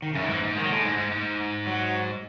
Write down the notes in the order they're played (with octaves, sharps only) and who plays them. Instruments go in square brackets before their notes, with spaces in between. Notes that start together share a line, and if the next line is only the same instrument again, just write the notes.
[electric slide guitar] D#3
[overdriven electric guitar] F#2 [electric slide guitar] C#3
[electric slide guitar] D#3
[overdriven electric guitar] G#2 [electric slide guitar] E3
[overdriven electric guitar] G#2
[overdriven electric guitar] D#3 [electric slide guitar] G#3
[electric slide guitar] F#3
[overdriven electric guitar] A2 [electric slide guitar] G#3
[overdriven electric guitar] G#2
G#2
G#2
[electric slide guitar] F#3